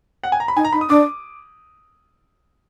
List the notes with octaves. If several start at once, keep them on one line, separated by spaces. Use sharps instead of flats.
F#5
G#5
A#5
B5
D#4 G#5
A#5
D#4 B5
D#6
D4 D6